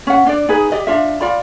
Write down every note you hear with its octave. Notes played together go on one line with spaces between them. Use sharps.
C#4 F#5
D4 D5
D#4 G#4 B4
G4 D5 D#5
D4 F4 E5
F4 D5 B5